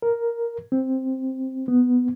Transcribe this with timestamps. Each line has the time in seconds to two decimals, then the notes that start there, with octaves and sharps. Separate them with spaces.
0.02 A#4
0.72 C4
1.68 B3